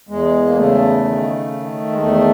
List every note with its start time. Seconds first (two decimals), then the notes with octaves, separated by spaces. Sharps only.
0.09 E2 G#3
0.46 A#3
0.56 C#3 A3
1.04 D#3
1.51 D#3
1.92 G#3
1.98 E2 A3